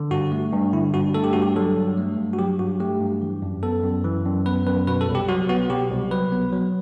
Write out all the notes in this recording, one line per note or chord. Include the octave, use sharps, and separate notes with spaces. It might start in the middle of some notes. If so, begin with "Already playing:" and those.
Already playing: D3
G2 F#4
A3
G2
D3 E4
G2 F#4
A3 A4
G4
G2 F#4
G4
F#3 A4
G2
A3
G2
F#4
F#3 G4
G2 F#4
A3 G4
G2
E3
F#2
B3 A4
F#2
E3
F#2
B3 B4
F#2 B4
B2 B4
A4
C2
G4
F#3 F#4
B3 F#4
B2 G4
C2
F#3 B4
B3
F#3